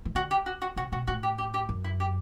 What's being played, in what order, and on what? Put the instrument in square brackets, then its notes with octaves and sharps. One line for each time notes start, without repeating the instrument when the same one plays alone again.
[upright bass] E3
[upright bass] D3 [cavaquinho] F#4
[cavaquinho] G4
F#4
F#4
[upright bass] C3 [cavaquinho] F#4
[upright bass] B2 [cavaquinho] F#4
[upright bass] A2 [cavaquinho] F#4
[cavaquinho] G4
G4
G4
[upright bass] F#2
[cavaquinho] E4
G4